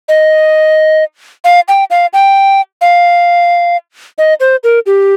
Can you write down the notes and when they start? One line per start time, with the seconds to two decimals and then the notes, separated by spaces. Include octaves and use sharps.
0.09 D#5
1.44 F5
1.68 G5
1.90 F5
2.13 G5
2.81 F5
4.18 D#5
4.40 C5
4.64 A#4
4.86 G4